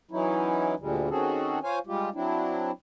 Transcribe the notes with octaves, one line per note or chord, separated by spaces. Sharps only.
E3 F#3 C#4 D#4 E4
D2 A#2 D3 G3 G#3
D#3 C4 C#4 F#4 G#4 A4
F4 C5 C#5 F5 G#5
G3 G#3 F4 G4
F#3 C4 D4 E4